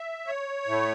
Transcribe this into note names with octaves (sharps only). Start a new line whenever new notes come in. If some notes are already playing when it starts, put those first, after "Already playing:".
Already playing: E5
C#5
A2 A3